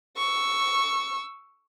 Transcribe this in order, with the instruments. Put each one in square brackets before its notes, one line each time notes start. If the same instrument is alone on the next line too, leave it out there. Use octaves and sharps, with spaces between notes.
[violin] C#6 E6